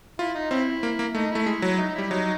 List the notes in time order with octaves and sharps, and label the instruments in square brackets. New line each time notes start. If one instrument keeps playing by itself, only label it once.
[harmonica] E4 [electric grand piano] F4
[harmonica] D#4
[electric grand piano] C4 [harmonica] C#4 E4
[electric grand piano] A#3
A#3
[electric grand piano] A3 [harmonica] D#4
[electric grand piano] A3 [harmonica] E4
[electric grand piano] G#3
F#3
[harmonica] D#4
D#4
[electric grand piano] G3 [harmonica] E4
[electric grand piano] F#3 [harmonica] D#4